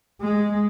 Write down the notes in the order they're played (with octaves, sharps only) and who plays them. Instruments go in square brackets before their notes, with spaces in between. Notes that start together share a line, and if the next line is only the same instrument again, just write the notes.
[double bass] G#3